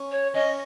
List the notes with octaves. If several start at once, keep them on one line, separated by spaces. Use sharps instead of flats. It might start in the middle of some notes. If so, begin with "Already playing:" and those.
Already playing: C#4
C#5
C#4 D#5